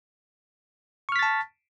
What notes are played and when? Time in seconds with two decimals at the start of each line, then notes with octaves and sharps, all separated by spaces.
1.09 C#6
1.12 F6
1.16 B6
1.19 A6
1.23 A5